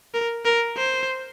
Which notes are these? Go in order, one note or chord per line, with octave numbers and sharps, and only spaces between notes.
A#4
A#4
C5